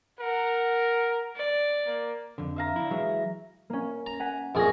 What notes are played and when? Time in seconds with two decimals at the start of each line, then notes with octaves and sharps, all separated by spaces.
0.20 A#4 F#5
1.36 D5
1.87 A#3
2.38 F2 D3
2.56 E5 F5 A#5
2.76 D4 E4
2.91 E3 F#3 G#3 E5
3.70 A#3 C#4
4.06 A#5
4.20 F#5 G#5 B6
4.55 A#1 F2 A#2 G#4 C#6 A#6